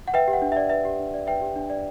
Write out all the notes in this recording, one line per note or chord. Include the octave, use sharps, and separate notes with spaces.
F#5
B4 E5 G5
G4
F#5
D4
E5
D5
B4 E5
G4
D4
D5
B4 E5 G5
G4
D4
D5